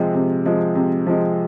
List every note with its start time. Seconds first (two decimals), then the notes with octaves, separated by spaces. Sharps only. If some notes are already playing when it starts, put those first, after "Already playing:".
Already playing: C3 F3 G#3
0.15 C3
0.46 F3 G#3
0.75 C3
1.07 F3 G#3